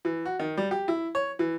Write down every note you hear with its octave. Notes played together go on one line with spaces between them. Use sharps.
E3
F#4
D#3
G3
G4
E4
C#5
E3